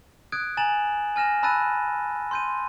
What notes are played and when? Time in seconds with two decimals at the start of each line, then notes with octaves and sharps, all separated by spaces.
0.32 D#6 F#6 G#6 D7
0.57 G#5 A#5 A6 E7 F#7
1.16 G#5 F6 A#6 E7
1.43 A5 B5 E6 F#6 A6 D#7
2.31 C6 G6 D#7